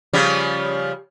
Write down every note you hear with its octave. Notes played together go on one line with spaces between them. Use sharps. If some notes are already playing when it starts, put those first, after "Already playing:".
C#3 F3 G3